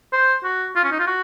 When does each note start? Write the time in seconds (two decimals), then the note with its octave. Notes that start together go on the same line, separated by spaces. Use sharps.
0.13 C5
0.44 F#4
0.76 F4
0.84 C#4
0.92 D#4
0.99 F4
1.07 F#4